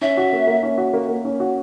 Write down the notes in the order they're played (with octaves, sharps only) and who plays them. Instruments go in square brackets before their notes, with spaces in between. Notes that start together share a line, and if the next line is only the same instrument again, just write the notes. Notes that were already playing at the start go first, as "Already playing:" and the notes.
[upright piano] C#4 [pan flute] E5
[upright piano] F#4
A#3
A#3
C#4
F#4
A#3
A#3
C#4
F#4